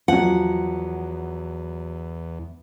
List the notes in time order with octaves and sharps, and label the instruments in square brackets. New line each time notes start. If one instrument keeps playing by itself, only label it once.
[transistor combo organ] E2 [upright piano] F3 F#3 [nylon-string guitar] F#5